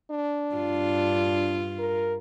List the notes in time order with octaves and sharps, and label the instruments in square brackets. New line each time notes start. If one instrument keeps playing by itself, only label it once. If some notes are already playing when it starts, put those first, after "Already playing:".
[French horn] D4
[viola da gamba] G2 F4
[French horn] A#4